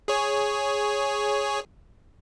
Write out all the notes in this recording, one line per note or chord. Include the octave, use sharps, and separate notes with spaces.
G#4 C#5